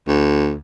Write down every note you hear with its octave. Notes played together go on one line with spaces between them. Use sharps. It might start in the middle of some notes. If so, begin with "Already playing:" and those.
D2